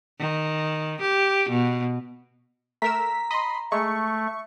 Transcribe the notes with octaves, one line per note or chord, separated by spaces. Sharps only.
D#3
G4
B2
A3 A#4 A#5 E6 B6
D#5 B5 C6
G#3 A3 C#6